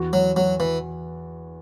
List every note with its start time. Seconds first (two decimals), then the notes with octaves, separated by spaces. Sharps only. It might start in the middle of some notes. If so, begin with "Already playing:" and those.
Already playing: E2 F#4
0.13 F#3
0.36 F#3 F#4
0.60 E3